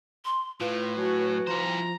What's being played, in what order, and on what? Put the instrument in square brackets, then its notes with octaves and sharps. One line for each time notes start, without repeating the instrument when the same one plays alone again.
[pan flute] C6
[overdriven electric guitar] A2 [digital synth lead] F4 [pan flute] B4
[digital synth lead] F#3 [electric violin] F#4 G#5
[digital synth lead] F3 [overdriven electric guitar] E4 C5 [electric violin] A#5